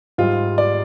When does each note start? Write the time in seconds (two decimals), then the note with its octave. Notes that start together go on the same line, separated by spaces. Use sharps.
0.18 G#2 G3 F4
0.58 D5